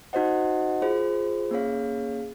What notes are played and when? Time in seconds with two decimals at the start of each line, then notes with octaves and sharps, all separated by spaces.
0.13 D#4 F#4 C5 D#5 F#5
0.82 F4 G#4 C5
1.51 A#3 C#4 G#4 C#5 F5